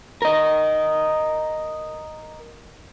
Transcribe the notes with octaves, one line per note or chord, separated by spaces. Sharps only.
A#4 D#5